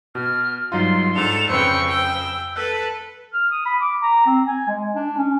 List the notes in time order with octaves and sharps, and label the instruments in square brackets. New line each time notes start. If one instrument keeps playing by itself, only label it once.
[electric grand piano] B2 [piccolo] F6
[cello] G2 [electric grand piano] F#3 D#4 F4 [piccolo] C6
[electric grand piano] G#2 D4 [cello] A4 [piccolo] F7
[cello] F2 [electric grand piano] C#3 B4 C5 [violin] G5 C#6 [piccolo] E6
[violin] G5
[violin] A4 [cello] B4 [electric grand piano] F#6
[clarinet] F6
D#6
B5
D6
A#5
C4
G#5
G#3
D4
C#4